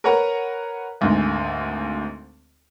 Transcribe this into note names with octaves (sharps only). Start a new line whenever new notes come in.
A#4 B4 C#5 F#5 A#5
G#1 D2 G#2